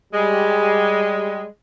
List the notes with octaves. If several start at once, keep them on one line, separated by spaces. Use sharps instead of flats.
G3 G#3